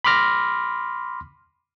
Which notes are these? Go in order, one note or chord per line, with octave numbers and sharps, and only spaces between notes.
B5 C6 D6 F6 A#6